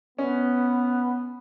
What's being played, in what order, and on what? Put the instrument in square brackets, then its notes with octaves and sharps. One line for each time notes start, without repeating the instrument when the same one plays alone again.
[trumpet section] B3 [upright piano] C#4